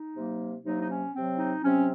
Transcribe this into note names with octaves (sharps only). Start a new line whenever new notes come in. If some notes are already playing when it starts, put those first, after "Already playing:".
Already playing: D#4
C3 F#3 A#3
C3 F#3 A#3 D#4
D#4
C#4
C3 F#3 C4
D#4
C3 F#3 C4 C#4